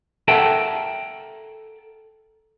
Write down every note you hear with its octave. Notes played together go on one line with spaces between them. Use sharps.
A4 A#4 E5 F#5 G5 A5